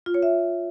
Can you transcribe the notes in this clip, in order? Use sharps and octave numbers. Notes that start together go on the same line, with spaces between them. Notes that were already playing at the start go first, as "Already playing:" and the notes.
F4
C#5
E5